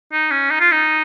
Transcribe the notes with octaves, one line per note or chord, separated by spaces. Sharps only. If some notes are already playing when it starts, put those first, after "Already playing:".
D#4
C#4
D#4
F4
D#4